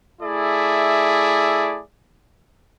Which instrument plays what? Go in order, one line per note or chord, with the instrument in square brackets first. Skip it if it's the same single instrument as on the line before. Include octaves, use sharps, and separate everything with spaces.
[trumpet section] A3 E4 G#4 D5 E5